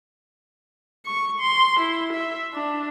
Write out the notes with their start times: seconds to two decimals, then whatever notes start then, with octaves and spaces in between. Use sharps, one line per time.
1.06 C#6
1.41 C6
1.80 E4
2.13 E5
2.53 D4